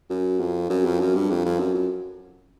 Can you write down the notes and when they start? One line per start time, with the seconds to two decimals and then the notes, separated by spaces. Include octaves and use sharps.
0.10 F#2
0.40 F2
0.70 F#2
0.85 F2
1.00 F#2
1.15 G2
1.30 F2
1.45 F2
1.60 F#2
1.74 F#2